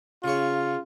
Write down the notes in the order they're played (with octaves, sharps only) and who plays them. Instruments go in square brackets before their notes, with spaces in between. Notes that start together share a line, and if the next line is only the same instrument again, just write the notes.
[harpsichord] C#3 C#5 [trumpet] F4